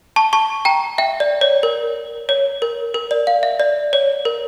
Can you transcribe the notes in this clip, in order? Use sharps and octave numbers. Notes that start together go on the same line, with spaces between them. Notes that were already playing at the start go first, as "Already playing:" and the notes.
A5 C#6
A5 C#6
G5 A#5
E5 G5
D5
C#5
A#4
C#5
A#4
A#4
D5
F5
E5
D5
C#5
A#4